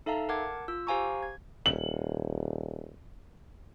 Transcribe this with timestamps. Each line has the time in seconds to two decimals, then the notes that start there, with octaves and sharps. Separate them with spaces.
0.06 D#4 A4 E5 F5 A5 A#5
0.29 A#4 F#5 A5 D6 G#6
0.68 F4 E6
0.87 G4 C5 F5 G#5 A#5 C#6
1.23 G#6
1.66 D#1 F#7